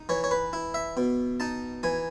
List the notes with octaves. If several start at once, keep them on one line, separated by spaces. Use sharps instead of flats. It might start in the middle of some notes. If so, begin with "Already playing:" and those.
Already playing: D#4
E3 C#5
C#5
B4
E4
E5
B2
D#4 A5
E3 G#5